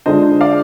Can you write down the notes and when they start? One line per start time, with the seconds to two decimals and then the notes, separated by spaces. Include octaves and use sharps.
0.06 D3 G#3 D4 F4 C5 D#5
0.41 D5 F5